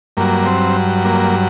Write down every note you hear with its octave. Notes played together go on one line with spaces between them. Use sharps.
G2 F#3 A#3
C4
A#3